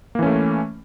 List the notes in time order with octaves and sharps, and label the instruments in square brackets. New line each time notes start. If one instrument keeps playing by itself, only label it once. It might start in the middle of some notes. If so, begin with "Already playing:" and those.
[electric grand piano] A#3
E3
C#4
A3